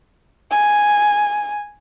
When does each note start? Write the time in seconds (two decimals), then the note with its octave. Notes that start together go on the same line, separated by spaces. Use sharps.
0.51 G#5